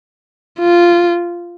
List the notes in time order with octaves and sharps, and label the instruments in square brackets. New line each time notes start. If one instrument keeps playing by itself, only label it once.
[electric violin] F4